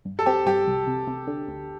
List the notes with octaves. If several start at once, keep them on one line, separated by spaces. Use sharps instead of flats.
G2
A4
C4 G4
G2 G4
C2
C3
C3
D3
D2